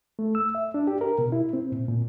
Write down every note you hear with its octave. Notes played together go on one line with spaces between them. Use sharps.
A3
E6
E5
D4
G4
A#4
B2
E4
C4
A#2
A#2